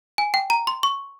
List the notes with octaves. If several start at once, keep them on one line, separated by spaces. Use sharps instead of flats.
G#5
G5
A#5
C6
C#6